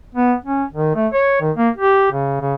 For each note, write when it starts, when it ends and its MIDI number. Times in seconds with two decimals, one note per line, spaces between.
0.15 0.34 59
0.45 0.64 61
0.73 0.96 51
0.96 1.07 57
1.13 1.39 73
1.41 1.51 51
1.57 1.69 58
1.77 2.09 67
2.12 2.39 49
2.41 2.55 49